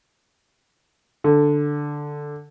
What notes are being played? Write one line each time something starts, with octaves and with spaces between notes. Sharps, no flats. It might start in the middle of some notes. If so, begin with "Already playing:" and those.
D3